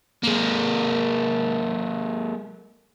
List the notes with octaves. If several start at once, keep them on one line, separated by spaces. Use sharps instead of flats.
G#3 A#3